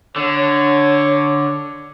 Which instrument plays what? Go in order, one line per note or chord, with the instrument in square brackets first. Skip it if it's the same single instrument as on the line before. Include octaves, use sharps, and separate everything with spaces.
[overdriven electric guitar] D3 [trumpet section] C#5